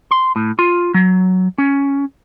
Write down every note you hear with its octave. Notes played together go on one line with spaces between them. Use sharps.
C6
A2
F4
F#3
C#4